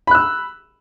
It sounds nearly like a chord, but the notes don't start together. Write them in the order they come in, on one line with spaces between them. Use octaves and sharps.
B5 F#6 E6